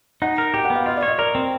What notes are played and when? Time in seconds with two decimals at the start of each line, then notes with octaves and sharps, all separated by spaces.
0.22 D#4 F#5
0.38 A#4
0.54 G4 G5
0.65 F#5
0.70 B3
0.76 F5
0.86 F4 D#5
0.97 D5
1.03 C#5
1.08 D#5
1.18 A#4 D5
1.35 C4